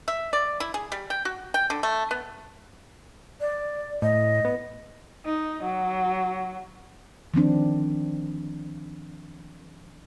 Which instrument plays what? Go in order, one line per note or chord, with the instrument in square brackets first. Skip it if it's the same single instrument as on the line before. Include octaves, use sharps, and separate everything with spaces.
[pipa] E5
D5
E4
G#4
G3
G5
F#4
G5
D3
A3
B3
[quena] D5
[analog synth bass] A2 [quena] D#5
[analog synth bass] B3
[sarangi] D#4
F#3
[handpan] D#3 F3 C4 D4